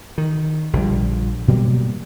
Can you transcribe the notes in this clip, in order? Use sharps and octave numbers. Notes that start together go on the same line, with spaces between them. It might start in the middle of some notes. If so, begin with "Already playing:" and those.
D#3
A#1 D3 F3 G3
B2 F#3 G3 A#3